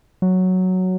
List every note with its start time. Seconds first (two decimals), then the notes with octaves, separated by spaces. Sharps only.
0.22 F#3